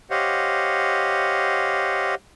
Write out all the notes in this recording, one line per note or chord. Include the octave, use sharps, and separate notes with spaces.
G4 C5 C#5 D#5 F5 F#5